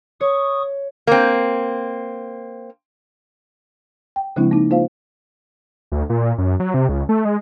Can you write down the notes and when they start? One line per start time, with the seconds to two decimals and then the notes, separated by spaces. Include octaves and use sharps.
0.21 C#5 C#6 D#6
1.07 A#3 C4
4.16 G5
4.36 C#3 F3 G#3 C4 D4 E4
4.51 A#3 D#4
4.71 A#3 F4 C5 F5
5.92 D2
6.10 A#2
6.38 F#2
6.60 F#3
6.74 C3
6.89 C#2
7.09 A3
7.25 G#3